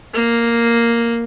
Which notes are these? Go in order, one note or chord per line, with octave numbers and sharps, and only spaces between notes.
A#3